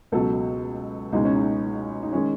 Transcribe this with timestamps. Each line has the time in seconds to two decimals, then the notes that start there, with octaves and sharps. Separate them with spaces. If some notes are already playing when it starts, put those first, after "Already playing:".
0.12 C#2 B2 F#3 A4
1.12 C#2 B2 G#3 D#4
1.25 C#4
1.36 D#4
2.03 D#4
2.13 D#3 G#3 C#4